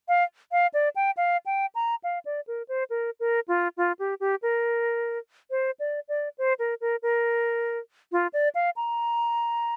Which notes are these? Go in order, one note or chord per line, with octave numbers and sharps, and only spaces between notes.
F5
F5
D5
G5
F5
G5
A#5
F5
D5
A#4
C5
A#4
A#4
F4
F4
G4
G4
A#4
C5
D5
D5
C5
A#4
A#4
A#4
F4
D5
F5
A#5